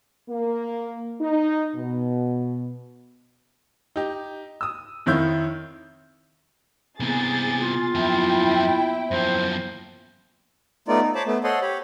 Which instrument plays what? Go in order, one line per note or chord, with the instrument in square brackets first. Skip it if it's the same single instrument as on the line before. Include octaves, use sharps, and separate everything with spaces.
[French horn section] A#3
D#4
B2
[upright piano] D#4 G4
D#6 E6
F2 D#3 E4 C#5 G6
[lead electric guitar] C3 E3 [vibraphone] A#3 B3 [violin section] G#4 A6
[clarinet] F4
[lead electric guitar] F#2 F3 [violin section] E4 G5
[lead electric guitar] F#2 F3 [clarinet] C5
[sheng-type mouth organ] A3 B3 D#4 F4 D5
D#4
C5 C#5 A5 B5 D6
A3 B3
A4 C5 C#5 D#5 F#5 C6
G4 C#5 B5